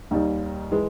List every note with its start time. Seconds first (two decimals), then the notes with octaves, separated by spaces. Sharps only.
0.11 D#2 D#3 G3
0.71 E3 G#3